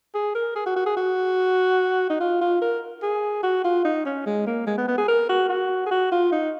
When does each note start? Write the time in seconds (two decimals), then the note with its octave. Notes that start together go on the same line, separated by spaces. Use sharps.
0.14 G#4
0.35 A#4
0.56 G#4
0.66 F#4
0.76 F#4
0.86 G#4
0.97 F#4
2.10 D#4
2.20 F4
2.41 F4
2.61 A#4
3.03 G#4
3.43 F#4
3.64 F4
3.85 D#4
4.06 C#4
4.26 G#3
4.47 A#3
4.67 G#3
4.78 B3
4.88 B3
4.98 G#4
5.08 A#4
5.29 F#4
5.49 F#4
5.86 G#4
5.91 F#4
6.12 F4
6.32 D#4